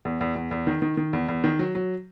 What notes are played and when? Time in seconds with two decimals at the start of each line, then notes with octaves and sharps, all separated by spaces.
0.05 E2
0.21 E2
0.36 E2
0.51 E2
0.67 D#3
0.82 D#3
0.97 D#3
1.13 E2
1.28 E2
1.44 D#3
1.59 F#3
1.75 F#3